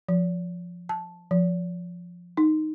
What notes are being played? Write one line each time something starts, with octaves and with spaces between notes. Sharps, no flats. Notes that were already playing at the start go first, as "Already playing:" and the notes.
F3
A5
F3
D#4